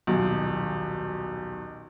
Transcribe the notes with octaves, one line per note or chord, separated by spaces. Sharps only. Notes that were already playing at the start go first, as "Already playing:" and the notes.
D#1 B1